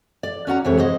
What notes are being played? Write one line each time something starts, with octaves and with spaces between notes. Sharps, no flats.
D5
C#4 F#4 F#5 A#5
F2 C3 E3 G3 G#3 C#5
G#4 C5 C#5 D#5